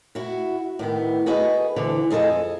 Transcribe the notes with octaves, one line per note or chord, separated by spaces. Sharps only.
E4 F#4
A2 D#3 B3
F#4 G#4 A4 B4 D#5
D2 D3 E3 E4
F2 G#4 A4 D#5